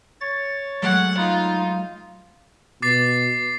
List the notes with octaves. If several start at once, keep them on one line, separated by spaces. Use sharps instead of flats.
C#5 A6
F#3 G#3 A3 F#5
D#4 F4 B5
B2 D6 A6 C7